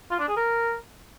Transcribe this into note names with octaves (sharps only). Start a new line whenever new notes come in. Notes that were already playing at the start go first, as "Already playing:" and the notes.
F4
D4
G#4
A#4